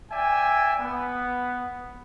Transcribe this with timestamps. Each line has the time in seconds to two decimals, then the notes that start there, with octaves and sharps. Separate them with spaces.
0.11 D5 E5 G5 G#5
0.80 B3